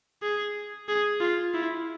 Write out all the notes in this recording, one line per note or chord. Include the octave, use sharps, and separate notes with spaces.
G#4
G#4
F4
E4